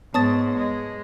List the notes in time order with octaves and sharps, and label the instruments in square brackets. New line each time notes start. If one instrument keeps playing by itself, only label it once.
[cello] G#2 [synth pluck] B3 C#5 [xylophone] A5 D#6 A6
[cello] G#3